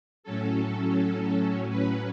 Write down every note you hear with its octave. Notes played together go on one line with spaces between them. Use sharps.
A2 F#3 C#4 A4
B4